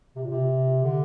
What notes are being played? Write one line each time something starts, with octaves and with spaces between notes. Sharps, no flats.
C3
A#2
C3
D3